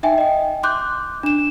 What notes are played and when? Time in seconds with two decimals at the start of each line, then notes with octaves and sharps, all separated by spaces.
0.03 D#4 E5 G5 G#5
0.18 D#5 G5
0.63 C6 D6 F#6 G6
1.23 D4 E7